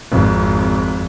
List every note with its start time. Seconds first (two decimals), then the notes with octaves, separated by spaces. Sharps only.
0.11 G#1 F2